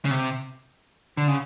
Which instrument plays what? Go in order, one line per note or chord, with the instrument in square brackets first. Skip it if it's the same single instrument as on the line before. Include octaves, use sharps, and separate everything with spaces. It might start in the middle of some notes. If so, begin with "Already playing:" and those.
[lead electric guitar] C#3
C3
D3
C#3